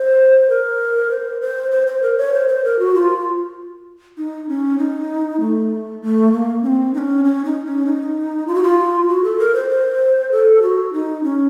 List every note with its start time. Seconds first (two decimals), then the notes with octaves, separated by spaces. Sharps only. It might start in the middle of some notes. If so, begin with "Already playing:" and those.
Already playing: C5
0.50 A#4
1.11 C5
1.41 C5
1.72 C5
1.87 C5
2.02 A#4
2.18 C#5
2.33 C5
2.48 C5
2.64 A#4
2.79 F#4
2.95 F4
4.17 D#4
4.49 C#4
4.79 D#4
5.40 A3
6.02 A3
6.32 A#3
6.63 C#4
6.67 C4
6.94 D#4
6.98 C#4
7.25 C#4
7.45 D#4
7.66 C#4
7.86 D#4
8.47 F4
8.55 F#4
8.63 F4
9.09 F#4
9.24 A4
9.39 A#4
9.55 C5
9.70 C5
10.31 A4
10.62 F#4
10.93 D#4
11.24 C#4